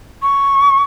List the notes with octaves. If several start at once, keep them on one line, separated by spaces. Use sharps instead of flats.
C#6